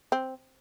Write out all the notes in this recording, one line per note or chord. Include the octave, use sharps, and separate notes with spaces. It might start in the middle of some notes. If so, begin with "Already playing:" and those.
C4